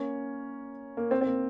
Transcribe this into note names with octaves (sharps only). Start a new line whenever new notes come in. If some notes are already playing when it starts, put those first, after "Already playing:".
Already playing: A#3 C#4
A#3
C4
C4
A#3